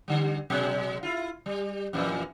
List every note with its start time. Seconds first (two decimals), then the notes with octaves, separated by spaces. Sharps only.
0.08 D3 G3
0.50 B2 F#3 G#3
1.03 E4 F4
1.46 G3
1.93 F2 A#2 E3